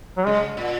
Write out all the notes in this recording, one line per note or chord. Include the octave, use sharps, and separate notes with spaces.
F#3
C#3 G#3
A#2